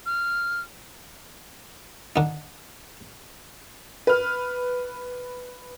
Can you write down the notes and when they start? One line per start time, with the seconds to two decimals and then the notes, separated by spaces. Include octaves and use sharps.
0.06 F6
2.16 D3 D#4
4.07 B4 F6